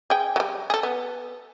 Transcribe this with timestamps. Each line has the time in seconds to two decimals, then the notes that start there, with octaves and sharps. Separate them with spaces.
0.10 G#4 G5
0.36 F#3 G3
0.70 G#4 A4
0.83 B3